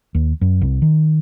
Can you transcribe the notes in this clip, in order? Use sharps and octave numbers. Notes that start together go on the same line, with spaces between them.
D#2
F#2
C2
D#3